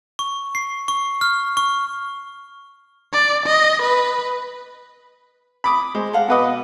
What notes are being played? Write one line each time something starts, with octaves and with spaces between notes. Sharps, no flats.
C#6
C7
C#6
F6
C#6
D5
D#5
B4
B5 D6 D#6
G#3 C5
A4 F5 F#5
B2 B4 D#5 F#5 D6